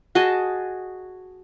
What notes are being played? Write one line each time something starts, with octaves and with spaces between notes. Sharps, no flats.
F#4 G#4 D#5 A5